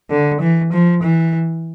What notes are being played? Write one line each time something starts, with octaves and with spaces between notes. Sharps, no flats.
D3
E3
F3
E3